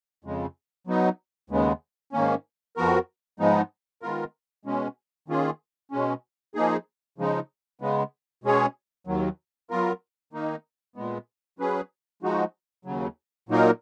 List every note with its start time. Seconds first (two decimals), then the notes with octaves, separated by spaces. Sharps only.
0.24 F2 C#3 G#3
0.87 F#3 B3 D#4
1.50 D#2 C#3 G#3 B3
2.13 G#2 D#3 A#3 C#4
2.77 F2 F3 B3 F#4 A#4
3.39 G#2 F3 G#3 B3 D#4
4.02 D#3 G#3 B3 F4 A#4
4.65 B2 G#3 C#4
5.28 D#3 A#3 C#4 F4 G#4
5.91 B2 G#3 C#4
6.55 F3 A#3 D#4 G#4
7.18 C#3 F3 G#3 D#4
7.81 C#3 G#3 B3
8.44 B2 G#3 C#4 G#4 C#5
9.07 D#2 D#3 F#3
9.70 F#3 B3 F4 A#4
10.33 D#3 A#3 D#4
10.96 A#2 G#3 B3
11.59 F#3 C#4 G#4 B4
12.23 F3 G#3 D#4 F#4
12.85 D#2 C#3 F#3
13.49 A#2 F#3 A#3 D#4 A#4